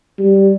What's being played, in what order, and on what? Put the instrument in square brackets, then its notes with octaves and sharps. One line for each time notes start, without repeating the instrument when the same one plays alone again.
[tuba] G3